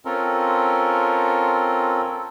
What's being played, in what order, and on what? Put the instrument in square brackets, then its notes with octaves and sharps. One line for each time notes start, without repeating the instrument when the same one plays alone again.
[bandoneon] C4 C#4 F4 A4 A#4